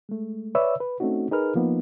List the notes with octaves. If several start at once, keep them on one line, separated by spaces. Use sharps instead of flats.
G#3 A3
B4 C#5 D5 E5 E6
B4
A3 C4 C#4 D#4 F#4
D#4 G#4 A#4 B4 F6
F3 A#3 B3 D#4